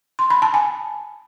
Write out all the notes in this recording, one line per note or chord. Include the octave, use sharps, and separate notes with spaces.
C6
B5
A5
G#5